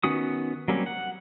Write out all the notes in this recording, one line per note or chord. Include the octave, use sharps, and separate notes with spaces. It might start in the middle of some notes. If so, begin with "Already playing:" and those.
D#3 B3 C#4 F#4 D#6
F#3 G3 A#3 C4 C#4
F#5